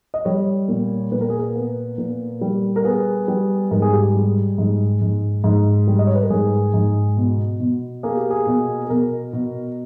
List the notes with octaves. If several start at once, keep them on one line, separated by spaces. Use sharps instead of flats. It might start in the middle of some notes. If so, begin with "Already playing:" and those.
D#5
G3 C#5
A#2
A#2 B4
A#4
G#4
A#4
B3
A#2
G3
A#4
B3 G#4
G3
G#2 A#4
G#4
G4
G#4
G3
G#2
G#2
G#2
G3
D#5
C#5
B4
A#4
G#2 G#4
G#2
B2
B2
A#3 G#4
G4
G#4
B2
G#4
B2 A#4
B2